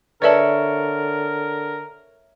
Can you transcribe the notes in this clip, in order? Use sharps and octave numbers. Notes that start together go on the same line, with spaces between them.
D3 A#4 B4 C#5 D5 E5 A5